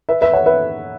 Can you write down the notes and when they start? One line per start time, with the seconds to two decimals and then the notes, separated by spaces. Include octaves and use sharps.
0.09 B4 E5
0.21 B4 E5
0.33 C#5 F#5
0.46 B4 E5